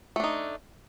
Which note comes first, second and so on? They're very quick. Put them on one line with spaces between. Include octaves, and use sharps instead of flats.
A3 D4 D#4